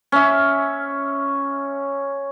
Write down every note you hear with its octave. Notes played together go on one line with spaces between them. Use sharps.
C#4 E5